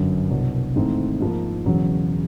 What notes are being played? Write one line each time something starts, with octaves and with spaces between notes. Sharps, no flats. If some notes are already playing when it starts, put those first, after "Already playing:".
Already playing: G1 F#2 D3 F#3
C2 B2 F#3
G#1 G#2 E3 A3 C4
G#2 F3 A#3
E1 E2 C#3 F#3